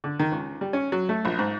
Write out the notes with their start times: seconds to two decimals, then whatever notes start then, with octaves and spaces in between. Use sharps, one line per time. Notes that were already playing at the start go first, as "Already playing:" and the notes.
0.04 D3
0.20 D#3
0.32 C#2
0.61 G3
0.73 C#4
0.92 F#3
1.09 A3
1.25 A#1
1.39 G#2